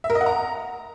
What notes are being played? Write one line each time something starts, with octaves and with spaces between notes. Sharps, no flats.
E5
A#4
D#5
F#5
A#5